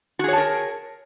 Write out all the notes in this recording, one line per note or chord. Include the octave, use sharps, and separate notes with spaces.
F#4 G#4 A#4 C#5 A5